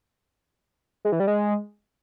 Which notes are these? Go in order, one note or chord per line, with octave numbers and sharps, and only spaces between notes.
G#3
E3
G3
G#3